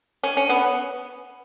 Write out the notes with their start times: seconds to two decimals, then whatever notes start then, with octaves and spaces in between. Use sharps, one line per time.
0.23 C#4
0.37 C#4
0.49 B3